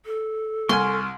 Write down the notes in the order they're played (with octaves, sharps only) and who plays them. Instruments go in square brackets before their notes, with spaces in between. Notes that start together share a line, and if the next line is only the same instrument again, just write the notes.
[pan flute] A4
[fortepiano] C2 G#5 [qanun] C6 [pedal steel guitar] C#6 F6